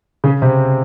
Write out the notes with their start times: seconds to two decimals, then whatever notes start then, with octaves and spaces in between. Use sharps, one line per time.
0.24 C#3 C#4
0.42 C3 C4